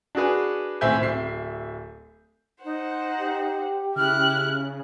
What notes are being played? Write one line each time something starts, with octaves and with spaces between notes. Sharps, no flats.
D4 F#4 G#4 B4
D#1 A2 C4 E5 G#5 G6
D1 E5 C7
D#4 C5 F#5
G4
C#3 E4 F6 F#6